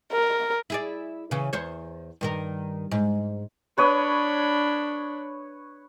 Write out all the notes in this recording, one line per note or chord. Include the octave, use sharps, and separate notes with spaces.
A#4
E4 G#4 D5
C#3 E3 C#4
E2 C5 C#5
G2 D#3 A#4
G#2
D4 B4 C#5 B5 D#6